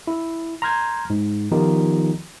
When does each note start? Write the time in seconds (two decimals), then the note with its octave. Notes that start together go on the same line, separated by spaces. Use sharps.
0.07 E4
0.62 A#5 C6 F6 G6 G#6
1.10 G#2
1.51 D#3 F3 B3 D#4 F4 G4